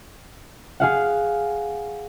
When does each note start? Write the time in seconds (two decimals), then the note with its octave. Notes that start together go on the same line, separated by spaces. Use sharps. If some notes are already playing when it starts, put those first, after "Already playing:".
0.80 G#4 F5 F#5